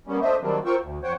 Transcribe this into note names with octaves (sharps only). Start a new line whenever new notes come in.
G3 A#3 B3 C#4
A3 D4 C5 D#5 E5
D#3 F#3 G3 A#3 C4 D4
F4 A#4 C5 G5 C#6 E6
D2
F2 C5 C#5 F#5 G5